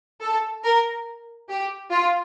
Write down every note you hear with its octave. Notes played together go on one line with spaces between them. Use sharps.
A4
A#4
G4
F4